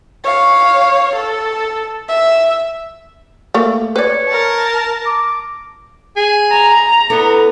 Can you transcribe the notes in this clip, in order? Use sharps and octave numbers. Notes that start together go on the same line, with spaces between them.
C#5 F5
A4
E5
A3 A#3
B4 C#5 D5
A#4 A5
A#5
D6
G#4
A#5
B3 D4 E4 A4